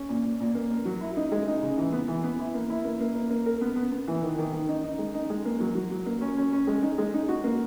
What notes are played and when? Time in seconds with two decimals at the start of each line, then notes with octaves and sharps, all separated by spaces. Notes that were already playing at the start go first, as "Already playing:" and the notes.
Already playing: C#4
0.09 A#2
0.25 A#2
0.40 A#2
0.55 A#3
0.70 A#3
0.85 F#3
1.01 E4
1.17 D#4
1.32 G#3
1.47 D#4
1.62 C#3
1.77 E3
1.93 B3
2.08 E3
2.24 B3
2.39 E4
2.54 A#3
2.70 E4
2.85 A#3
3.00 A#3
3.15 A#3
3.30 A#3
3.46 A#4
3.61 B3
3.76 B3
3.92 B3
4.07 E3
4.23 D#3
4.38 D#3
4.53 D#3
4.69 D#4
4.84 D#4
4.99 G#3
5.14 D#4
5.30 G#3
5.45 A#3
5.60 F#3
5.75 F#3
5.91 F#3
6.06 A#3
6.21 C#4
6.37 C#4
6.53 C#4
6.67 G#3
6.83 D#4
6.98 G#3
7.14 D#4
7.29 F#4
7.44 A#3